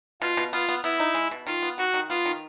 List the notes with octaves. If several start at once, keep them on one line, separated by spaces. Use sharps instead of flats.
B2 F4
B2
B3 F4
B3
B3 E4
D#4
G#3
B2
D#3 F4
B3
D#3 F#4
D#3
B3 F4
D#3